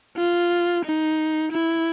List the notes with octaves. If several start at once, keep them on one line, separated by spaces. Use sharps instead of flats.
F4
D#4
E4